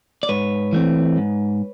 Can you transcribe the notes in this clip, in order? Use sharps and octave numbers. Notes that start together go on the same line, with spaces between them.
D5
G#2 B4 C#5
E3 A3 C4
G#2